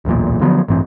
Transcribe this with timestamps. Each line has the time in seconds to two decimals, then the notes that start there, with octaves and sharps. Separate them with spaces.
0.05 D1 B1 E2 A#2
0.41 D3 F3 F#3 B3
0.68 A1 G2 E3 C4